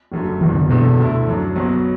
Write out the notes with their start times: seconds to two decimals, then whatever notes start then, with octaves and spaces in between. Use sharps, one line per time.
0.12 F#1 F#2 D3 A3
0.41 F#1 E2 B2 E3
0.55 D3
0.70 E1 E2 B2 D3 A3
0.98 D2 D3 A3 E4
1.27 F#2 F#3 D4
1.56 B1 B2 F#3 B3